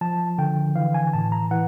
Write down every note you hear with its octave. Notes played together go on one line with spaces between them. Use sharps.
F3 A5
D3 G5
E3 F5
G#5
A2 A5
A#5
E3 F#5